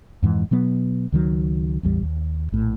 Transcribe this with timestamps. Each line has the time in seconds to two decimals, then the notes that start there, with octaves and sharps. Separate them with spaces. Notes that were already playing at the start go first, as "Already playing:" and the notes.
0.22 F2 G#2 E3
0.51 B2 F#3 B3
1.12 C#2 D#3 F#3
1.83 A1 E2 G3
2.03 D#2
2.52 A#1 A2